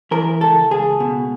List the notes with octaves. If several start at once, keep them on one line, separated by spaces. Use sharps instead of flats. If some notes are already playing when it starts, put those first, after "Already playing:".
E3 A#4
C#2 A4
C#2 G#4
B2